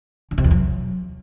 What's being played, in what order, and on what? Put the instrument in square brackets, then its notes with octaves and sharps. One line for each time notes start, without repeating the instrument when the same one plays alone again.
[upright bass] D3
C3
E2
F#3